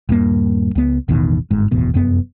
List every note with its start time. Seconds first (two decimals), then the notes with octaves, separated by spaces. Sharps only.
0.09 D#1 G2 A#3
0.75 C#2 B3
1.08 A1 E2 B2 D#3
1.51 G1 G#2
1.71 D1 G#1 E2 B2
1.94 F1 F#2 B3